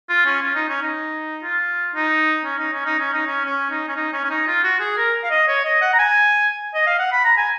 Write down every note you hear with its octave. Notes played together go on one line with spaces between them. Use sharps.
F4
C#4
F4
D#4
C#4
D#4
F4
D#4
C#4
D#4
C#4
D#4
C#4
D#4
C#4
C#4
D#4
C#4
D#4
C#4
C#4
D#4
F4
F#4
G#4
A#4
F5
D#5
C#5
D#5
F#5
A#5
G#5
D#5
F5
F#5
B5
A#5
G#5